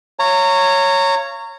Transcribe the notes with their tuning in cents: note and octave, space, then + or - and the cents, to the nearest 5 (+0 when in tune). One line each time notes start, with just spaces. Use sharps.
C#5 +0 F5 -35 A#5 -25